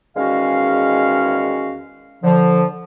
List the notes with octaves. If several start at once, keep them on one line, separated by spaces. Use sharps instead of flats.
E2 D#3 G#3 C#4 F#4 F5
D3 F3